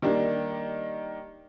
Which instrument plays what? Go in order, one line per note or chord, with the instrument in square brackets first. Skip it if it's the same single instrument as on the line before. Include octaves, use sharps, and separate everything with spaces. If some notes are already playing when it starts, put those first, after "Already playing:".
[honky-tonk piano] D#3 G3 A#3 D4